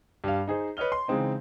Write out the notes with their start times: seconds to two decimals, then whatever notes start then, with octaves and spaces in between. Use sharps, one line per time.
0.24 G2 G3 F5
0.47 D#4 G#4 C5
0.77 B4 C#5 D#5 F6 G7
0.92 C6
1.08 C#3 E3 G#3 C4 D#4